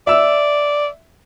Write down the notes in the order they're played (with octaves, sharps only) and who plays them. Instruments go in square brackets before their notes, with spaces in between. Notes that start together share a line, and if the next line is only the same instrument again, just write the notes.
[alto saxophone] D5 [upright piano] E5 E6